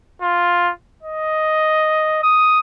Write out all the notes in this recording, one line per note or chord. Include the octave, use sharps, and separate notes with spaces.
F4
D#5
D#6